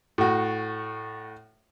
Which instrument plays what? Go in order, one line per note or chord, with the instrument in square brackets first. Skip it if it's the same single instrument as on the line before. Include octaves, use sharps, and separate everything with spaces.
[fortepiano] A2 F#4